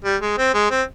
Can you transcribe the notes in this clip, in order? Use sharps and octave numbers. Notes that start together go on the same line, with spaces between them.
G3
G#3
C4
G#3
C4